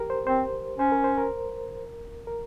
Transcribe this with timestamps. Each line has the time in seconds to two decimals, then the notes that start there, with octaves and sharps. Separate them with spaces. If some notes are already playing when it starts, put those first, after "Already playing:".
Already playing: G4 A#4
0.10 C5
0.27 C4 C5
0.78 C#4 C5
0.92 A#4
1.04 C5
1.18 A#4
2.27 A#4